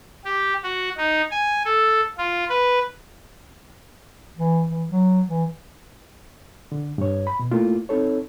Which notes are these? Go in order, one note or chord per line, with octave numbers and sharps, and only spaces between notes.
G4
F#4
D#4
G#5
A4
F4
B4
E3
E3
F#3
E3
D3
G2 C#5
B5
B2
A3 A#3 E4 F4
C4 D#4 A4 C#5